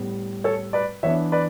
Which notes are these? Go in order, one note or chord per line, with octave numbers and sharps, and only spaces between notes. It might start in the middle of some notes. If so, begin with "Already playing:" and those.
Already playing: A2 G3 B3
A4 C#5
B4 D5
E3 B3 D4 C#5 E5
B4 D5